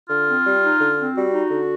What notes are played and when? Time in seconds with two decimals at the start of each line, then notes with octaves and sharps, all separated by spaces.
0.08 D3 F4
0.26 C4
0.45 G3
0.62 D#4
0.80 D3
0.97 C4
1.15 G3 F#4
1.32 D#4
1.50 D3